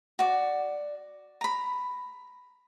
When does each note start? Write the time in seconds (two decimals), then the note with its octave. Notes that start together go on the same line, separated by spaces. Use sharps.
0.19 F#4 D5
1.41 A#5 B5